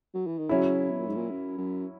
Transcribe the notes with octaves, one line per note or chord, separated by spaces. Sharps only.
F#3
E3
D#3
C#3 F#3 C#4 E4
B2
A#2
G#2
A#2
F#2
F#2